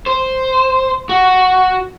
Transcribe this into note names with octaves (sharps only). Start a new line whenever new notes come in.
C5
F#4